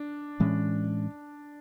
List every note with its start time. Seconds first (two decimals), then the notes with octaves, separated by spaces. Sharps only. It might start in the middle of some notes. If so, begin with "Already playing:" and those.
Already playing: D4
0.40 A2 E3 G#3 C#4